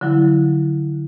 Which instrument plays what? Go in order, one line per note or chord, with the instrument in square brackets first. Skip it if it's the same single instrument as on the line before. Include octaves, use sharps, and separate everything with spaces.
[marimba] D3 F3 F#3 E4